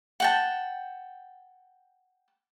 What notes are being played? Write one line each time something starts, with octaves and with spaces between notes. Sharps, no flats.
F#5 G5 A5